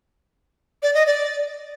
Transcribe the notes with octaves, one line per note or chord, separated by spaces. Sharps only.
D5
D#5
D5